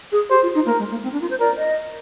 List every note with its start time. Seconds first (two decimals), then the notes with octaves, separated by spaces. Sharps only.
0.12 G#4
0.30 G4 C5
0.42 F4
0.55 D#4
0.66 A#3 A#4
0.79 G#3
0.91 A#3
1.03 C4
1.13 D4
1.21 F4
1.30 C5
1.40 A#4 D5
1.57 D#5